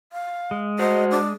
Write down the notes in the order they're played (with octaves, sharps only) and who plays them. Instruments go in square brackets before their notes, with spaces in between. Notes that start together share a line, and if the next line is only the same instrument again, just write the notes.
[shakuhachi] F5
[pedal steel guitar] G#3
[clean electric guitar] F#4 C5 [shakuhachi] D#5
[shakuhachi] D4